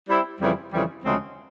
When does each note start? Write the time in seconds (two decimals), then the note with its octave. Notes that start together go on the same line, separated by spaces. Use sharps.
0.08 G3 C4 E4
0.40 F2 C#3 E3 G3
0.71 F2 C#3 E3 G3
1.03 D2 C#3 F3 G#3 C4